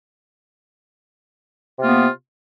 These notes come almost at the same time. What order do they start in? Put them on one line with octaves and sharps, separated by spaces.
C3 F4 A#3 B3